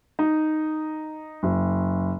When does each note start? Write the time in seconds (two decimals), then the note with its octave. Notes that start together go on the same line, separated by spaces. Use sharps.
0.19 D#4
1.43 F#1